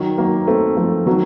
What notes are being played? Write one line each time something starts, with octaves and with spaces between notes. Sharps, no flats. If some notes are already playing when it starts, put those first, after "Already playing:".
Already playing: D#3 F#3
F#3 A#3
A3 C4
F3 A3
D#3 F#3